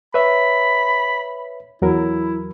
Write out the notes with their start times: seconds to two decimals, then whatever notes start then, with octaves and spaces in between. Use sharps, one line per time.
0.14 B4 C#5 E5 B5
1.82 E2 F#3 E4 A#4